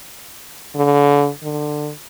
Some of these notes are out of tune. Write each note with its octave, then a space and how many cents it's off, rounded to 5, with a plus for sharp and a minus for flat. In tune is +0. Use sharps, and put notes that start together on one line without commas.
D3 -35
D3 +20